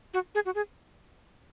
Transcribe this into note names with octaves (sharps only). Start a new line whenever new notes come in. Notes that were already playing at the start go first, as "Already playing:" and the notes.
F#4
G#4
F#4
G#4